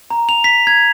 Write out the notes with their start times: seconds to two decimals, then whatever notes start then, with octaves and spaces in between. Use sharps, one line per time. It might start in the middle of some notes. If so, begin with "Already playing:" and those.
0.10 A#5
0.29 F7
0.44 B6
0.67 G#6